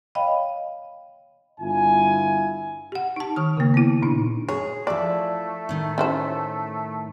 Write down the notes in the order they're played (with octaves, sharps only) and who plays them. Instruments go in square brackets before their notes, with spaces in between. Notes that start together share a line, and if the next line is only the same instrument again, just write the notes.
[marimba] C#5 D#5 F5 G5 B5
[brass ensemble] G1 E4 F4 G#5
[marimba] G4 F#5
D#4 A5
D#3 C#6 F6
C#3 A#3
B3 E4
A#2 D4 D#4
[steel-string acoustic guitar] G#4 [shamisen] C#5
[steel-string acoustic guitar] F3 E4 [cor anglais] A3 [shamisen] D5
[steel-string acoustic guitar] A2 D#3
[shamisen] C#4 E4 C5